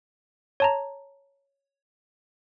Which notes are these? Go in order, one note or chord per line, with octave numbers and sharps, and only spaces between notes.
C#5 A5 A#5